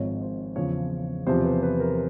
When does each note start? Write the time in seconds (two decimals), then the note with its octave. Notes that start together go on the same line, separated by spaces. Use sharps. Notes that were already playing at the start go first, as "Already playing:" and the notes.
Already playing: G#1 G#2 F3 C#5
0.21 C5
0.56 E2 C#3 F3 C#5
1.27 E2 C3 F3 C5
1.44 B4
1.63 B4
1.80 A#4